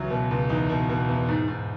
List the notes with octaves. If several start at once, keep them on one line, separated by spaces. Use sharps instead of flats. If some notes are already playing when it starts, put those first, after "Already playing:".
Already playing: C#2 E3 F#3
B2
C#2
E2 D#4
B2
B2
E2
G#2
G#2